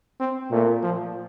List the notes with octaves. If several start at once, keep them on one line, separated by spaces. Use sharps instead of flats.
C4
A#2 A3
F3